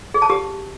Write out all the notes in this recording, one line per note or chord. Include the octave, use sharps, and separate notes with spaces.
G#4
A5
G4